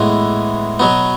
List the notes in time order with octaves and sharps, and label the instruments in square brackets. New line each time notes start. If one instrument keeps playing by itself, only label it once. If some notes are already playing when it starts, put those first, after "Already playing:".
Already playing: [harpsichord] A2 E3 G#3 B3
B2 F#3 B3